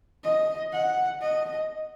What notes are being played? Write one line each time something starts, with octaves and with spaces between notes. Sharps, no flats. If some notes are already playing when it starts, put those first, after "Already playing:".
D#5
F#5
D#5